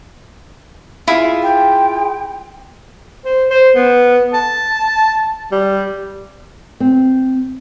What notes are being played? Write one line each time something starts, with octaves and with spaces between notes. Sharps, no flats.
E4 F4 G#4
G5
C5
C5
B3
A5
G3
C4